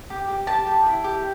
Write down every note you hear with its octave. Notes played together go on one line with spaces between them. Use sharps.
G4
G4
G4 A5
G4
E4
G4